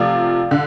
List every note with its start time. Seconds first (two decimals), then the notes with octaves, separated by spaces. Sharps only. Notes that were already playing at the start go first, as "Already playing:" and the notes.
Already playing: C3 F3 A3 D5 F5
0.51 D3